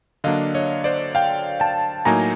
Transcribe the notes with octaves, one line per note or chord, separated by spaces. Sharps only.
D3 F#3 A#3 D4 D#5 F5
C#5 D#5
C5 D5
F5 G5
G5 A5
A2 F#3 A#3 D#4 G#5 A#5